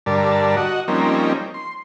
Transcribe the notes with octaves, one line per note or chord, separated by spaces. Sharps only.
G2 D3 G3 A#4 D5 A5
F#4 D#5 F#5
F3 G3 A#3 C4 C#4 D#4
C6